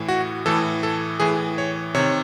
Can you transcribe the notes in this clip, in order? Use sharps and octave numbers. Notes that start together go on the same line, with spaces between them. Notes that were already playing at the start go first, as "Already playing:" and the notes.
Already playing: A2 E3
F#4
A2 E3 A4
A4
A2 E3 G#4
C#5
C3 D#3 C#5